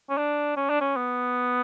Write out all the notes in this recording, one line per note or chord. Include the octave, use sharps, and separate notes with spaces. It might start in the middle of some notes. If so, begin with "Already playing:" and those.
C#4
D4
C#4
D4
C#4
B3